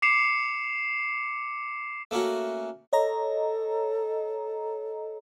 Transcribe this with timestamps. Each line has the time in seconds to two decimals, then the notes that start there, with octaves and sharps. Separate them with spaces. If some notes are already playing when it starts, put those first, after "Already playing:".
0.02 D6 C7 C#7 E7 F7
2.11 A3 A#3 C#4 F#4
2.93 A4 C#5 D#5 A#5